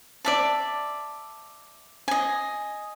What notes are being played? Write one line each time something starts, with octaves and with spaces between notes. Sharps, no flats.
D5 E5 A5
D#5 G#5